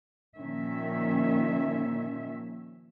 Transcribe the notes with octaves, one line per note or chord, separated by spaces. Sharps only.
A#2 D#3 F3 C#4 E5